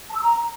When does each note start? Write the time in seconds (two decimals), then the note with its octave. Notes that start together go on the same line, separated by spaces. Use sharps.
0.10 A5
0.16 E6
0.22 A#5